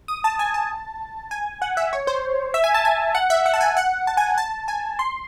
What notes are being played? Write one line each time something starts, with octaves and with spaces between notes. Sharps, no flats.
D#6
A5
G#5
A5
G#5
F#5
E5
C#5
C5
E5
G#5
A5
G#5
F#5
E5
F#5
A5
G#5
F#5
A5
G#5
A5
G#5
C6